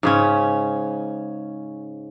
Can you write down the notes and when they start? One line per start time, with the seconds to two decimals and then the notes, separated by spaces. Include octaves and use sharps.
0.03 G#2 C#3 C#4